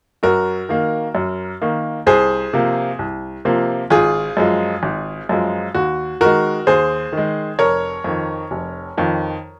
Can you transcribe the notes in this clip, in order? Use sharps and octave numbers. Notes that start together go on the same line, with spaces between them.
F#2 F#4 A#4
D#3 A#3
F#2
D#3 A#3
C2 G#4 C5
C3 F3 A#3
C2
C3 F3 A#3
G#1 F4 G#4
F#2 F3 G#3
G#1
F#2 F3 G#3
D#2 F#4
D#3 G#3 F#4 A#4
D#2 G#4 C5
D#3
G#3
F1 A#4 C#5
F2 D#3
F1
F2 D#3